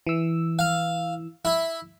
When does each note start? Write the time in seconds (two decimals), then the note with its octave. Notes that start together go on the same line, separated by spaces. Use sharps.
0.07 E3 E6
0.59 F5
1.45 E4